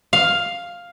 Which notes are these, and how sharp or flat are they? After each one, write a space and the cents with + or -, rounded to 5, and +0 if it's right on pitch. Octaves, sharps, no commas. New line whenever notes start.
F5 +5